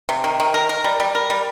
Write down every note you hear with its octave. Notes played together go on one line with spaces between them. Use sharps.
C3
D#3
D#3
A#4
A#4
G3
G3
A#4
G3